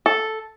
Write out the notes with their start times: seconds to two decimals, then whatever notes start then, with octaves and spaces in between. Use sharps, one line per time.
0.06 A4